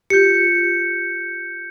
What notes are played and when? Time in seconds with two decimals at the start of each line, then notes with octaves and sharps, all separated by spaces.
0.10 F4 G4 G6 C#7